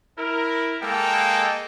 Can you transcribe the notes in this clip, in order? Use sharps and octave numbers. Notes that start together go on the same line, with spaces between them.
E4 A#4
G#3 A#3 A4 D#5 G5